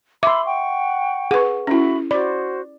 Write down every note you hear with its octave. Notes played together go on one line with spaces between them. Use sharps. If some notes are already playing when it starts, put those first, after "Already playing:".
E5 B5 C6 D6 E6
F#5 G5 C#6
G#4 B4 F#5 C#6
C#4 E4 F#4 E5 B5
F#4 C5 D5 B5